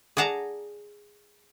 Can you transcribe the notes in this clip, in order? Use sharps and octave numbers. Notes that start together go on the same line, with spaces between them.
G#4 D5 F#5 A5 A#5